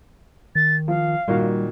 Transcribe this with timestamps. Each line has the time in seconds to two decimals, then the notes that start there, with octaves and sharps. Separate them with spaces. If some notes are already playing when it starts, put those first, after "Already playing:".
0.56 D#3 A6
0.88 F3 F5
1.28 A#2 D#3 G3 F#4